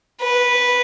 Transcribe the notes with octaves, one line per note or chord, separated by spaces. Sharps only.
B4